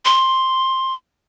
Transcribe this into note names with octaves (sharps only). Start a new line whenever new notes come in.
C6